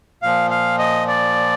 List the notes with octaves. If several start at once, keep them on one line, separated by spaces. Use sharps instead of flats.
A#2 F3 F5
F5
D#5
D5